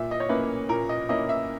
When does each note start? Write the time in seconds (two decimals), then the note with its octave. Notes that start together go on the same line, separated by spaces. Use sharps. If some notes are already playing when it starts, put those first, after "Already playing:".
Already playing: A#2 E5
0.11 D#5
0.20 C#5
0.29 A#3 C#4 E4 B4
0.69 A#2 A#4
0.89 D#5
1.09 A#3 C#4 E4 D#5
1.29 E5